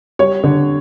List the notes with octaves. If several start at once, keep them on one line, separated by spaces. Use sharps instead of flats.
G3 C#5
D3